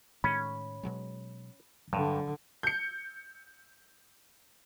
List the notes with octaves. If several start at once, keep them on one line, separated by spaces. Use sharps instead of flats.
A2 D#3 G#3 C#4 B5
B2 F#3 G#3
G2 D3 F#3
G6 C#7